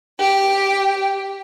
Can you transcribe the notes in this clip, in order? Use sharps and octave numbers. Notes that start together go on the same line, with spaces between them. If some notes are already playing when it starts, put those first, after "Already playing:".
G4